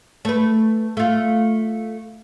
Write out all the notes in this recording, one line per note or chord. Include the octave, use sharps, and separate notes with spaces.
A3 B4
A3 F4